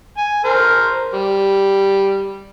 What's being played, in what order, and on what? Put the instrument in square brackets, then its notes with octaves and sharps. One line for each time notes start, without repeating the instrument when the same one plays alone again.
[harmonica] G#5
A#4 C5
G3